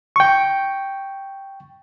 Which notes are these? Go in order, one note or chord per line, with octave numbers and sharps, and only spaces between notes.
G5 C#6